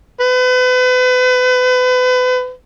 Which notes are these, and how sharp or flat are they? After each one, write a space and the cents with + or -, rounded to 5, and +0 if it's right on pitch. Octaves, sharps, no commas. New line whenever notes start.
B4 +35